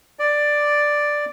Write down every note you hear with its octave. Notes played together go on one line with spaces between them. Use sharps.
D5